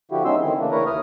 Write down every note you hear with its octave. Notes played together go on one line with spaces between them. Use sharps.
D3 F3 E4 F#4 G4
G#3 B3 C#4 D#4 C6 E6
D3 D#3 C4 E4
C#3 E3 A3 A#3 D4
E4 A#4 B4 C#5 A#5
D#2 D#6 F6